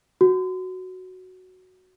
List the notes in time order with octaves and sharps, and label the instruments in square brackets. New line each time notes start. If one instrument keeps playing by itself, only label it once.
[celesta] F#4